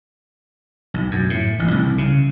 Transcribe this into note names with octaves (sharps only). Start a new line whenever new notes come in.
B1
F#2
A2
A1
C2
C#3